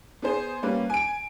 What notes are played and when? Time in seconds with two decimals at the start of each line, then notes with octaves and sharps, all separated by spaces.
0.22 B3 G#4 C5
0.63 G3 A#3 C#4 B4
0.90 G#5 D7